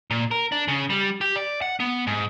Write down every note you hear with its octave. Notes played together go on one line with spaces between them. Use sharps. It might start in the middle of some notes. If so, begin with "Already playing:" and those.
A#2
A#4
D4
C#3
G3
G4
D5
F#5
B3
G#2